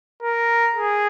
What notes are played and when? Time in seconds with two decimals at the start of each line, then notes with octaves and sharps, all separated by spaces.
0.23 A#4
0.76 G#4